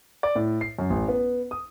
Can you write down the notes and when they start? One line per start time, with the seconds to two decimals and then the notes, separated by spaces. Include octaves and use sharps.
0.23 D5
0.36 A2
0.61 C7
0.79 F#2
0.90 A1
1.08 B3
1.51 D#6